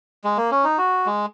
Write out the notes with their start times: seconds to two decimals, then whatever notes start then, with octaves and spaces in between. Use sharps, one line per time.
0.24 G#3
0.37 A#3
0.51 C#4
0.64 D#4
0.78 F#4
1.06 G#3